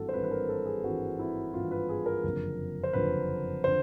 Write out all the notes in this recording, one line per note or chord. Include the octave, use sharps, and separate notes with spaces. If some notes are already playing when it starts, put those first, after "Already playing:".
Already playing: G#1 G2 E3 F#4 A4
C5
G#1 G2 E3 B4
B4
A#4
A4
G#4
G#1 G2 E3 F#4
E4
G#1 G2 E3 F4
B4
G#4
A#4
F#1 F2 D3
C5
F#1 F2 D3 B4
D3 C5